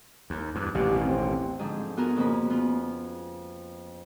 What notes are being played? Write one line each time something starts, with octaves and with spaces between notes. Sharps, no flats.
D#2
E2 G2
A1 D#2 B2 G4
C4
G#2 D3 F3 G#4
B3 F4 F#4 G#4 A#4
F2 C#3 A#3 C#4 B5
B3 F4